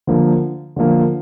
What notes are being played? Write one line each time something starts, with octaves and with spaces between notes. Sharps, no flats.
D3 F3 A#3
D3 F3 A#3